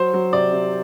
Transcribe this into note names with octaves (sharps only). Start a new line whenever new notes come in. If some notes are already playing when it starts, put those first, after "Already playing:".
Already playing: F#3 C5
F#3
C3 D5
C3